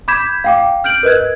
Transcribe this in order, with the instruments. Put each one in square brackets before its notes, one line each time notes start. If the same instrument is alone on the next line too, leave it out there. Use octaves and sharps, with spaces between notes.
[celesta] B5 D6 G6 G#6 B6 E7
F5 G5 D6
F6 G6 D7 F#7
A#4 B4 D#5 F#6 G#6